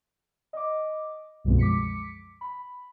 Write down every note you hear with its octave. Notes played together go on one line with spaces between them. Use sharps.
D#5 D6
C2 F#2 B2 F3 G#3
D6 B6 C#7
B5